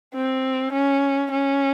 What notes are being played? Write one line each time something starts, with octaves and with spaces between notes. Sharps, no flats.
C4
C#4
C#4